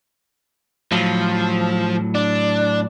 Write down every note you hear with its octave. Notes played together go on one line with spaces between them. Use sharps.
A2 F3 F#3
D4